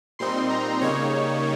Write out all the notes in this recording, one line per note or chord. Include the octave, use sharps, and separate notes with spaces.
A#2 G3 C4 D#4 C6
A#5
C#3 G3 A#3 D#4 C#5